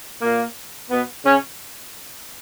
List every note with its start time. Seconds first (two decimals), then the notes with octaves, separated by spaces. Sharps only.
0.21 A#2 A#3
0.90 B2 B3
1.24 C#3 C#4